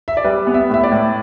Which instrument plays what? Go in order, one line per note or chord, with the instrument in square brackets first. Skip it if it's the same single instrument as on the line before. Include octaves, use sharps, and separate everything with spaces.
[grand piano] E5
D5
[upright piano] G3 [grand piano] B4
[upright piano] B3
[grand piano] E5
[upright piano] A2 [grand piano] E5
[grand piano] D5
[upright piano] A2